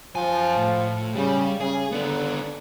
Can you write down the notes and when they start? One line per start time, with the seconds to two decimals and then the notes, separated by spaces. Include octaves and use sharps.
0.15 F#2 F3 G#5
0.58 A2
1.16 C#3 G3
1.60 C#3 G#4
1.92 D3 B3 D4